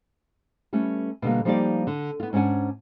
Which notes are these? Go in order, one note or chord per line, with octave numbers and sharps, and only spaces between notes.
G3 A3 C#4 B4
B2 D3 G3 A#3
F3 G3 A#3 D#4 G4 D5
D3
B3 F4
G#2 C#4 D4 F#5 G#5